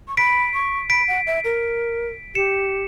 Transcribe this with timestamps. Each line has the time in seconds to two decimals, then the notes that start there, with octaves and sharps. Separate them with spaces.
0.08 C#6
0.17 B5 B6 D7
0.53 C#6
0.90 B5 B6 D7
1.08 F#5
1.26 E5
1.44 A#4
2.35 G4 C#7 E7